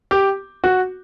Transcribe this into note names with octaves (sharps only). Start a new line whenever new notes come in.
G4
F#4